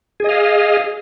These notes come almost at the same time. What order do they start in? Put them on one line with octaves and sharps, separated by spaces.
G#4 D#5 F5